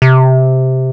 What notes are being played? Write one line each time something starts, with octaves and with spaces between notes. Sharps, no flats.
C3